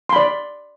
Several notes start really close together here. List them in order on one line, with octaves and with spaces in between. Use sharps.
C6 B5 D5